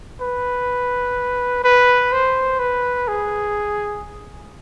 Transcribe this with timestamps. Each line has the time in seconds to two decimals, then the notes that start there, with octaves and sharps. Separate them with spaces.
0.21 B4
1.64 B4
2.12 C5
2.59 B4
3.08 G#4